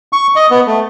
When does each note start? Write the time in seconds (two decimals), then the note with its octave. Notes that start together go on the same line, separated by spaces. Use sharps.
0.13 C#6
0.36 D#5
0.51 B3
0.67 A3